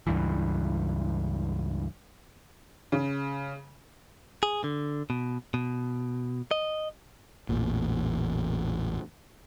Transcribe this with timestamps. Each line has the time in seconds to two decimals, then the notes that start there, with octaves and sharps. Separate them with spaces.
0.07 C#2 G2 E3
2.92 C#3
4.43 G#4
4.64 D3
5.10 B2
5.54 B2
6.51 D#5
7.49 A1 E2 A#2